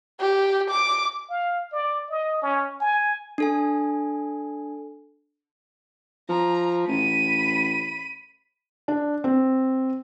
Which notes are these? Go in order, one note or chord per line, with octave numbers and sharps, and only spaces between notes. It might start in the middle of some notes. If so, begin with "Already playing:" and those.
G4
D6
F5
D5
D#5
C#4
G#5
D4 A4 G#5
F3 A#5
A1 B5 D#7
D4
C4